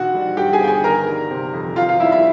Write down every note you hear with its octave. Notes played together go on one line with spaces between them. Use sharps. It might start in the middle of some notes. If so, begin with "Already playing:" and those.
Already playing: A#1 D#3 F#4 F#5
G3
G2 G4 G5
G#4 G#5
G1 G5
G#4 G#5
D#3 A#4 A#5
G3
C3
F2
D#3 F4 F5
F4 F5
G3 E4 E5
E4 E5